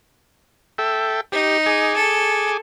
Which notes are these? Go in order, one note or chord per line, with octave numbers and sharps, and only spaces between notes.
A4 E5 G5
D#4 G4
G#4 G#5 D6
A4